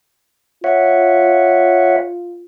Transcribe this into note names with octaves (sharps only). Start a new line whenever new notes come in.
F4 C#5 E5 F#5